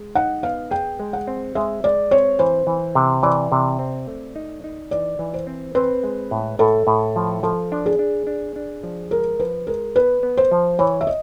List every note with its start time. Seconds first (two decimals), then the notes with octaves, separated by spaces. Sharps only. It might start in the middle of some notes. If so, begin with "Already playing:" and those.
Already playing: G#3
0.15 D#4 F#5
0.43 B3 F5
0.71 G#4 G5
1.00 G#3
1.13 F#5
1.28 C4
1.55 G#3 E5
1.84 G#3 D5
2.11 C4 C#5
2.39 E3 C5
2.67 E3
2.95 C3
3.23 E3 D5
3.52 C3
3.79 C4
4.08 A3
4.36 D#4
4.64 D#4
4.91 E3 D5
5.19 E3
5.34 C5
5.47 C4
5.75 C4 B4
6.03 G#3
6.31 A2
6.59 A2 A4
6.87 A2
7.16 F3
7.43 F3 A4
7.72 D4
7.86 G#4
7.99 D4
8.27 D4
8.56 D4
8.83 F3
9.11 G#3 A#4
9.39 F3 B4
9.67 G#3 A#4
9.96 B3 B4
10.23 B3
10.37 C5
10.52 F3
10.79 E3 C#5
11.01 E5
11.07 D#5